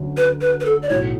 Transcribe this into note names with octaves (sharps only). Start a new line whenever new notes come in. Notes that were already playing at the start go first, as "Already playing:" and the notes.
Already playing: D2 D3 F#3 C#4
B4
B4
B4
A4
D5
B1 A2 F#3 C#5